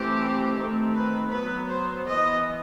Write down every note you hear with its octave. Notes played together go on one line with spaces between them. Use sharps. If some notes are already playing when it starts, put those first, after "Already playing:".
Already playing: E3 A3 C4 G4
D#3 A3 C4
B4
F#3 B3 B4
C5
E3 B3 D#5